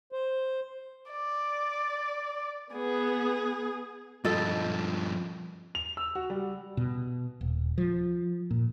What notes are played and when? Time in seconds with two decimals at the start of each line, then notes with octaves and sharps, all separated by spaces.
0.12 C5
1.12 D5
2.74 B3 G#4
4.24 G2 F3 A4 D#5
5.75 F7
5.97 E6
6.15 F#4
6.30 G3
6.77 B2
7.41 D#1
7.78 F3
8.51 A#2